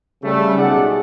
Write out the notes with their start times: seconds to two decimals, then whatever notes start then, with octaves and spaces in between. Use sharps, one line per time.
0.23 C#3 G3 A3
0.57 B1 D#4 G#4 A4 D5 F#5